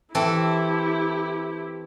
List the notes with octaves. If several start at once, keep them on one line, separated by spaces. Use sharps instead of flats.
E3 C4 E4 G4 A4